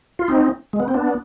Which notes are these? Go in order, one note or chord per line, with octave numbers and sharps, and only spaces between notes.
F4
C4 D#4
G#3
B3
C4
B3 D4